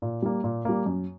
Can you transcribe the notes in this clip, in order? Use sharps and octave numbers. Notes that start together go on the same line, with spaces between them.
A#2
G3 A#3
A#2
G3 A#3
F#2